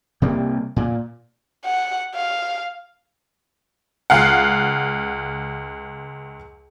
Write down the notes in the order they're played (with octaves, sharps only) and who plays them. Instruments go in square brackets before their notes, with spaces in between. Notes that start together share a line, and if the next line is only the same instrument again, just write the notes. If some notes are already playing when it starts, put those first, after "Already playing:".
[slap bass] C3 G3 A#3
A#2
[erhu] F#5
F5
[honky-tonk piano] C#2 F5 F#5